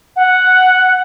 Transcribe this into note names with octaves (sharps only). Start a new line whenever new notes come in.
F#5